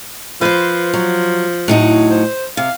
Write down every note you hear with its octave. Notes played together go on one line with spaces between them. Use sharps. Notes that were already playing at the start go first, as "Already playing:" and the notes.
F3 B4 C5
F#3
A2 F#3 D#4
C5
C3 F5